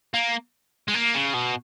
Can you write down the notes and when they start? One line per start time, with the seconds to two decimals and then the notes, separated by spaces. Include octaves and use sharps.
0.14 A#3
0.88 G#3
0.94 A#3
1.15 C#3
1.34 B2